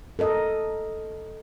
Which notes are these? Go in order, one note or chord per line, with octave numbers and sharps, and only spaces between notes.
A4 A#4 D#5